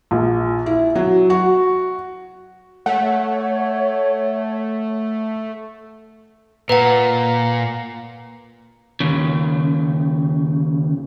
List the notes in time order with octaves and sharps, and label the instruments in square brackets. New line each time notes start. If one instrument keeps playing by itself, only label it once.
[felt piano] A#1
E4
F#3
F#4
[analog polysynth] A3 [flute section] C#5 [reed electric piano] F#5
[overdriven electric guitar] A#2 [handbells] B4 F#5 [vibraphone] A#5
[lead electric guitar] D#2 C#3